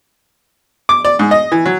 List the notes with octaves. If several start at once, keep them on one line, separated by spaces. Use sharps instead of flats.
D6
D5
G#2
D#5
E3
F#3